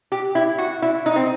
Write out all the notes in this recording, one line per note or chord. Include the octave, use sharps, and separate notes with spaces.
G4
E4
F#4
E4
D#4
C4